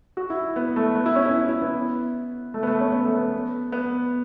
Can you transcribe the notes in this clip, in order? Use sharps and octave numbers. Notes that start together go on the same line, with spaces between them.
F#4
E4
B3
A3
B3
E4
C#4
E4
E4
B3
A3
B3
A3
C#4
B3
A3
B3
B3